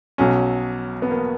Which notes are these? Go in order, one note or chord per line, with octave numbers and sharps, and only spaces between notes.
B1 B2 F#3 C#4
B3
A#3